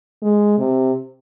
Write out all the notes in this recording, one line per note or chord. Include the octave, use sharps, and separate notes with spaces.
G#3
C3